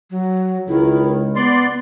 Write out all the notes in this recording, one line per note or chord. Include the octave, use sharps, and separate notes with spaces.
F#3
C#2 D#3 E4
B3 D5 C6